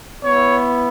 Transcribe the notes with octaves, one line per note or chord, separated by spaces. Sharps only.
B3 E4 C#5